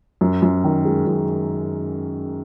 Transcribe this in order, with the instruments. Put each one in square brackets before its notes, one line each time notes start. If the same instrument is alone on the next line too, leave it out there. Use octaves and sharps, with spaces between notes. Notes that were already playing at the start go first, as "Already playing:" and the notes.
[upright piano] F#2
F#2
D#3
G#3
F#2